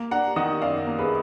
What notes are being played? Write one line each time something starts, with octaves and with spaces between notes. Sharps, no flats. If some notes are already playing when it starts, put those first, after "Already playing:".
Already playing: A#3
D4 F#5 A#5
D#3 D#5 F#5
F#2 D5 F5
A#3
G#4 B4